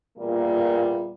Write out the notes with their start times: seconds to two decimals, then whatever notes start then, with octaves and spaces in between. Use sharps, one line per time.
0.17 E2 A#2 G3 A#3 F4